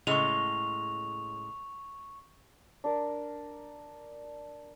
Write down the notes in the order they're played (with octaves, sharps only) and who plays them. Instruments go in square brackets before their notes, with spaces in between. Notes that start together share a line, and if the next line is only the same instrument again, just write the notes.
[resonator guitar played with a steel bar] A2 C#3 G#3 [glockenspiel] C#6 F7
[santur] D4 A#4